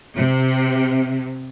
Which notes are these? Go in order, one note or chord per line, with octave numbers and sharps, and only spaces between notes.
C3